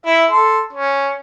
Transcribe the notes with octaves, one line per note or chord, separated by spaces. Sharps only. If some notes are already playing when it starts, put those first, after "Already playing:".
E4 E5
A4 C6
C#4